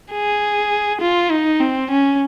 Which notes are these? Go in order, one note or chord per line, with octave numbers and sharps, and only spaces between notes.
G#4
F4
D#4
C4
C#4